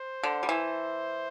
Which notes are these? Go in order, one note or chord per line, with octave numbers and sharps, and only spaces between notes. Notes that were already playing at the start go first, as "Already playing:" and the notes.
Already playing: C5
D3
G3
E3